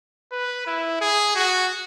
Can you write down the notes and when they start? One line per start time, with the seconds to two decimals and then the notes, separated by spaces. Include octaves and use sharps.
0.32 B4
0.66 E4
1.01 G#4
1.35 F#4